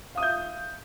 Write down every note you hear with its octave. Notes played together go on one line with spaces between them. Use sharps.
E5 F5 D#6 G6